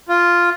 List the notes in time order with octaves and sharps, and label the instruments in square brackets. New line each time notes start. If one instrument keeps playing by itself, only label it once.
[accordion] F4